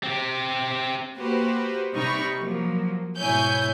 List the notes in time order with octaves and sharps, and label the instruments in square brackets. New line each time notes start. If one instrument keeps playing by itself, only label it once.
[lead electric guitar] C4 G4
[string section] A#3 F#4 G4 B4 C5
C3 G3 D#4 B5 C#6
F3 F#3 A#3
G#2 B2 E4 C#5 G#5 G6